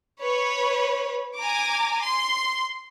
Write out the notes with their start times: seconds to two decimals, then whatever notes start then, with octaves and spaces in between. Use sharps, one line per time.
0.20 B4 C#5
1.39 G#5 A#5 D6
2.03 C6